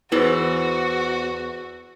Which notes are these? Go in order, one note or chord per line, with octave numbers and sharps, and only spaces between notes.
E2 E3 B3 F#4 G#4 C5